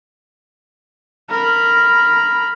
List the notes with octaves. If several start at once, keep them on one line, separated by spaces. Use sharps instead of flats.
A#4 B5